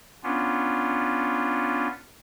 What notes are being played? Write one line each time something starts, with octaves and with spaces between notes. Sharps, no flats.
B3 C#4 D4 F4